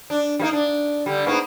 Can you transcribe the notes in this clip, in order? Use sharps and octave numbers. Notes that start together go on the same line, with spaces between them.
D4
G3 A#3 D#4
D4
D3 G3
G#2 A#3 B3